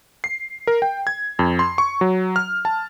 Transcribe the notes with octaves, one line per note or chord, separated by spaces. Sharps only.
C7
A#4
G5
G#6
F2
C6
C#6
F#3
F6
A5